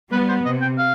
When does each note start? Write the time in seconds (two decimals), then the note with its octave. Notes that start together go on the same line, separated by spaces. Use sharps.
0.12 G3 B3 B4
0.29 C5
0.45 C3 D#5
0.62 G5
0.78 F5